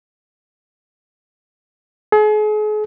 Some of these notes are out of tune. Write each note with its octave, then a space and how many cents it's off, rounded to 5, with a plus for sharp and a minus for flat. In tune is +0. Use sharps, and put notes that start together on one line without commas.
G#4 +40